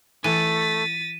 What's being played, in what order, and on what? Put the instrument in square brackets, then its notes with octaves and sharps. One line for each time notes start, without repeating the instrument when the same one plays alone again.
[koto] E3 [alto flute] A3 [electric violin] A6 B6 [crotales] D#7